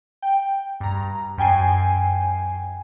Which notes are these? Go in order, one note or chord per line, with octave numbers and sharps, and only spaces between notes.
G5
G2 A#5
F#2 G5 G#5 C7